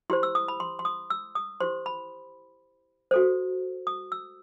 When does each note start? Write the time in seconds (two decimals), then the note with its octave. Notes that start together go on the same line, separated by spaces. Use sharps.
0.10 E4 G4 C5 C6
0.23 E6
0.35 D#6
0.48 B5
0.60 C6
0.79 C6
0.85 D#6
1.10 E6
1.35 D#6
1.60 E4 G4 C5 C6
1.86 B5
3.11 F#4 A4 C5
3.87 D#6
4.12 E6